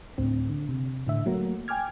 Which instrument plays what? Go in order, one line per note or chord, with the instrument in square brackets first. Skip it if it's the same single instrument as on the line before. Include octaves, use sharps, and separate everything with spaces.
[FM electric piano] D2 A2 D3 C4
D3
C3
A2 D3 E5
F#3 A3 A#3 F#4 A#4
G5 G#5 D6 F6 G#6